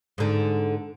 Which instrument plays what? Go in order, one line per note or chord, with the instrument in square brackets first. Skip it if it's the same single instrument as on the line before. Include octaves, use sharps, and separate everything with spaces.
[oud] G#2 D3